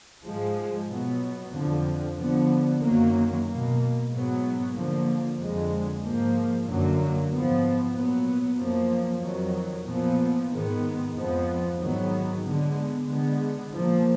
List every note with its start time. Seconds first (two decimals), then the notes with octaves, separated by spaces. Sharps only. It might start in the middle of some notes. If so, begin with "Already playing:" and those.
0.24 G#2 F3 G#3
0.88 B2 F#3 B3
1.52 F2 D3 F3
2.16 D3 F3 B3
2.81 F#2 D#3 F#3 A#3
3.45 B2 A#3
4.09 G#2 F#3 B3
4.74 D3 F3 A#3
5.38 F2 D3 G#3
6.01 G#2 F3 A#3
6.65 F#2 D3 F#3 A#3
7.31 G#2 F3 B3
7.94 A#2 F#3 B3
8.58 F#2 F3 A#3
9.22 F2 D#3 F#3
9.86 A#2 F3 B3
10.51 G#2 D#3 G#3 B3
11.15 F2 F3 B3
11.80 G#2 D#3 F#3 B3
12.43 D3 G#3 B3
13.07 D3 G#3 B3
13.71 A#2 F3 A#3